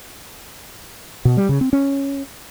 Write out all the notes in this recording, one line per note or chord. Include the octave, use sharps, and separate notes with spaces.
B2
G3
C#3
C4
C#4